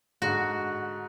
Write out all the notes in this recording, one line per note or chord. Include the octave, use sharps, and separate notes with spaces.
G#2 D3 F#4 F#6